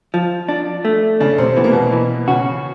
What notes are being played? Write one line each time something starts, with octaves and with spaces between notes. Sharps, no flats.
F3
D4
A3
C#3 C#4 D4
C3 C4
E3 B3
A#3
B2 B3
E3
C#3 C#4 F#4